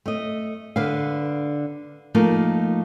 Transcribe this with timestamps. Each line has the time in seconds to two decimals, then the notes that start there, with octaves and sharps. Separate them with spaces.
0.06 A3 D#5
0.76 D3 B4 F5
2.14 F3 A3 A#3 D#4